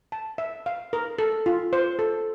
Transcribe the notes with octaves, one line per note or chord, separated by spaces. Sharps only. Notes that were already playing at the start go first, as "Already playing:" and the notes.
A5
E5
F5
A#4
A4
F4
C5
A4